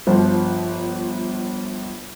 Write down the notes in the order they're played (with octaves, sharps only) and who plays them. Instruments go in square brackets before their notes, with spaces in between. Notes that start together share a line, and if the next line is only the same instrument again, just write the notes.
[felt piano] G1 F3 C5